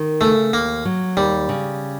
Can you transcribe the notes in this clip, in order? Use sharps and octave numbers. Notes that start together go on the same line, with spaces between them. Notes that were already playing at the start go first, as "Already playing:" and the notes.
Already playing: D#3
C#3 A3
D#2 A#3
F#3
D#2 G3
C#3